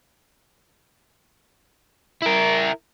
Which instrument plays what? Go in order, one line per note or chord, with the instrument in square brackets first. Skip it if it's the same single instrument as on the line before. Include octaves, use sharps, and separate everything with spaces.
[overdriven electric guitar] E4 A#4